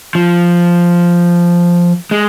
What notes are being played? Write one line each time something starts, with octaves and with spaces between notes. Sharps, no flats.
F3
G#3